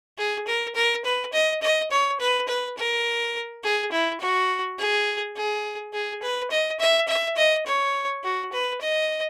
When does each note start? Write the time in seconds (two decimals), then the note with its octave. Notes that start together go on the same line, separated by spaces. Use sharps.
0.18 G#4
0.47 A#4
0.75 A#4
1.05 B4
1.33 D#5
1.62 D#5
1.91 C#5
2.20 B4
2.48 B4
2.77 A#4
3.63 G#4
3.92 E4
4.21 F#4
4.79 G#4
5.36 G#4
5.93 G#4
6.22 B4
6.51 D#5
6.79 E5
7.08 E5
7.37 D#5
7.66 C#5
8.24 F#4
8.52 B4
8.81 D#5